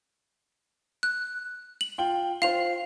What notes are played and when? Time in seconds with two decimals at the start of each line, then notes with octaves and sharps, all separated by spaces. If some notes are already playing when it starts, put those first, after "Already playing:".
1.03 F#6
1.81 F#7
1.98 F4 G5
2.42 F4 C5 F5 F7